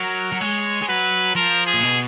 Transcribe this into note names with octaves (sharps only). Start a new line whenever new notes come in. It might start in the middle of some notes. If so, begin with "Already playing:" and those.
Already playing: F#3 A#4
F#3
G#3 C#5
G#3
F#3 B4
F3 A#4
G#4
A#2
B2